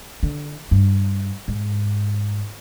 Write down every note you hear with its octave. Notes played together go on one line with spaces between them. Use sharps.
D3
G2
G#2